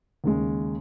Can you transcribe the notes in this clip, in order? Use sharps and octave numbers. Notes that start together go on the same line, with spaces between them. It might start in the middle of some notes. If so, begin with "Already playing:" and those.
D#2 C#3 G#3